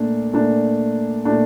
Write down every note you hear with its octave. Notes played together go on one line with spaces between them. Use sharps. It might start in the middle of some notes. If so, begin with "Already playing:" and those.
Already playing: A#2 A3 D4
A#2 A3 D4
A#2 A3 D4